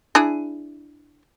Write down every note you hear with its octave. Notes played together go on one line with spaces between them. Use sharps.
D4 E4 G#4